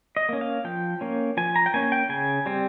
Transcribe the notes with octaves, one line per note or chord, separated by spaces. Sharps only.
D#5
A#3 C#4
F5
F3 G5
A#3 C#4
F3 G#5
A#5
G5
A#3 C#4 G#5
G5
C#3 G#5
G3 C4